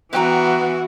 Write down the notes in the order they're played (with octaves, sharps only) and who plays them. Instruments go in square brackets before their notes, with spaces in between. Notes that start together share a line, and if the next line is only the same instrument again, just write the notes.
[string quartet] E3 B3 [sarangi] F#4 [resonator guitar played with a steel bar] B4 G5 A#5